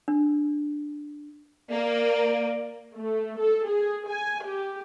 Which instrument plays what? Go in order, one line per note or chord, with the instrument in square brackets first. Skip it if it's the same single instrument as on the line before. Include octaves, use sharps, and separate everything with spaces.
[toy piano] D4
[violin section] A#3 [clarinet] D5
[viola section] A3
A4
G#4
G#5
G4